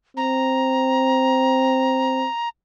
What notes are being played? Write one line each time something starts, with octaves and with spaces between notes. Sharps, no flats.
C4 A#5